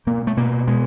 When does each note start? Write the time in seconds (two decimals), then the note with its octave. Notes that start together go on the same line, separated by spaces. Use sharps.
0.07 B2 A#3
0.27 A3
0.37 B2 A#3
0.68 B2 G#3